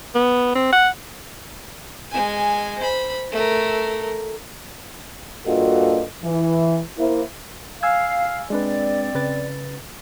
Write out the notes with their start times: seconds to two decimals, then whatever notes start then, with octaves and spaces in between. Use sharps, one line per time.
0.15 B3
0.55 C4
0.73 F#5
2.11 G#3 G#5
2.79 C5 B5
3.32 A3 A#4
5.46 G2 A#3 F4 F#4 A4 D#5
6.24 E3
6.98 A#3 E4 C5
7.83 F5 G#5 E6 G#6
8.50 G#3 C4 D4 B4 D5
9.15 C#3 B4 A6